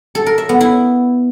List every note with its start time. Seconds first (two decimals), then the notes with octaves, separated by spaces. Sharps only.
0.15 A4
0.26 A#4
0.38 E5
0.49 B3
0.61 E4